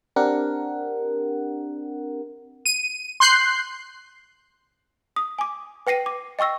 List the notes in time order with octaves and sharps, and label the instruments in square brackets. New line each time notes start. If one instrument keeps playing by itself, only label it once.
[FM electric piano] C4 D4 G4 A#4 F#5
[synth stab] D#7
C6 F#6 G6 C7
[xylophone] D#6
G#5 D6
B4 G5 A#6 C7 D#7
D6
D#5 G5 C#6 E6 A#6